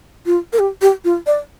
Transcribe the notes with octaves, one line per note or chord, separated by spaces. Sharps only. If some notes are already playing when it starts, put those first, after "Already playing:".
F4
A#4
G4
G4
F4
D5